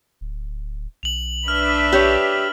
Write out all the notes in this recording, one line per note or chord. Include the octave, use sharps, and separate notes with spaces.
D1
B1 F7 F#7
D4 B4 E5 F6
G4 C#5